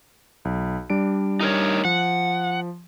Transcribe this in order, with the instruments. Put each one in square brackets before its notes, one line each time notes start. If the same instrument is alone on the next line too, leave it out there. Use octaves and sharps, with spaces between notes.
[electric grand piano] B1
G3 D4 D7
[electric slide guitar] D#4 A#4 C#5
[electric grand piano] F3 [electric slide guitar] F#5